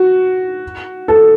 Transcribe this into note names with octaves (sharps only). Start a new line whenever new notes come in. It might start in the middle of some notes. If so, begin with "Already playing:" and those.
Already playing: F#4
A4